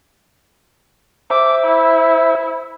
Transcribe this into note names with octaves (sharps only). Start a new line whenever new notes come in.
C5 E5 D6 E6
E4